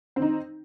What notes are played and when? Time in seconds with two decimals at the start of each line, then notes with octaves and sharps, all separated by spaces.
0.16 C4
0.19 D#3
0.22 D#4